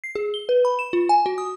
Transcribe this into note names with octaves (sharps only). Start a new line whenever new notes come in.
C7
G#4
G7
B4
B5
E7
F4
G#5
F#4
D#6